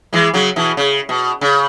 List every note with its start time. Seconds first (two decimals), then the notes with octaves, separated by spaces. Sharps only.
0.13 E3 G#3
0.34 C#3 F#3
0.56 B2 E3
0.77 C#3
1.09 B2
1.41 C#3